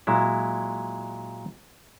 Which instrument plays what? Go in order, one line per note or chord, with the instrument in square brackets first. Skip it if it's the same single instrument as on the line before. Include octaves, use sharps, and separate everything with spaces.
[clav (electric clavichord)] A#2 F#3 G#3 E4